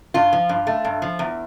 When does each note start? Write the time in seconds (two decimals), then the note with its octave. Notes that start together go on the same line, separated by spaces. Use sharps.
0.14 G2 F4
0.33 F3
0.49 G2
0.67 A3
0.85 G2
1.02 F3
1.19 E2